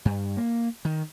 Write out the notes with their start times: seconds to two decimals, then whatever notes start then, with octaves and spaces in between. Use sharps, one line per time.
0.05 G2
0.37 A#3
0.85 D#3